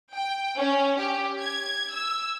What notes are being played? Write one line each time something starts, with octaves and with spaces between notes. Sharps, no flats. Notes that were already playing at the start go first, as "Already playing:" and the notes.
G5
C#4
G4
G#6
E6